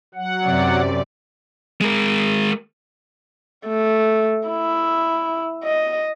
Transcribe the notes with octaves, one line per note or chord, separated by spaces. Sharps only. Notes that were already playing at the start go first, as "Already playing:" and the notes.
F#3 F#5
F#2 C3 D5
G#3 A#4
A3
E4
D#5